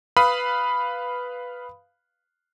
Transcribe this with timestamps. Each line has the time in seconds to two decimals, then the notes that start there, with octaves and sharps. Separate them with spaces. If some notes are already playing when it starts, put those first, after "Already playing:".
0.17 B4 F5 B5 D#6